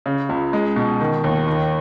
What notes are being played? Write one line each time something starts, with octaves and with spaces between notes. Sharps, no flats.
C#3
C#2
G#3
B2
D#3
D#2
D#3